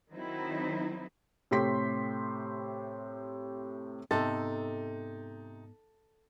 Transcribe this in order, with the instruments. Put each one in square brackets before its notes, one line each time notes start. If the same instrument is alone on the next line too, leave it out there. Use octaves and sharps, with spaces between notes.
[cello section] D#3 F#3 C4 D#4 E4
[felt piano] A2 C3 G4 A4 C6 B6
[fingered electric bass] G#2 B3 [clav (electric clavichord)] C3 [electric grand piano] D#4 A6 [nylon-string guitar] A4